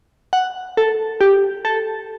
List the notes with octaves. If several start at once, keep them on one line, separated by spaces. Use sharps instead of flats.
F#5
A4
G4
A4